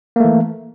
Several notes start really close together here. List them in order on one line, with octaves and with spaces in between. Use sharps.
A#3 A3 E3